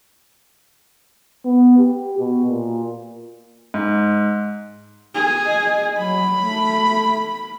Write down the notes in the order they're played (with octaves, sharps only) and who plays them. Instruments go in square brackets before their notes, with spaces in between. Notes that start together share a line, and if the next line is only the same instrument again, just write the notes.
[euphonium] B3
G4
B2
A#2
[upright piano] G#2
[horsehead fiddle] G#4
[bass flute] D#5
[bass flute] F#3 [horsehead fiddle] B5
[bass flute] A3